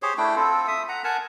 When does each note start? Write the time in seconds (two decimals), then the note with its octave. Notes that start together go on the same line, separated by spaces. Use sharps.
0.02 G4 G#4 C5 C#5
0.18 A3 D4 E4 G5
0.36 C4 F4 A4
0.67 E5 D#6
0.88 F#5 A#5
1.04 A#4 F#5 G#5 A5